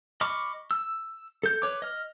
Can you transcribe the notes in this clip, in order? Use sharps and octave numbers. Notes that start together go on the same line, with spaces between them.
D#5 B5 C#6 D6 F6
E6
A4 G6
B4 C#5 D6
D#5 F6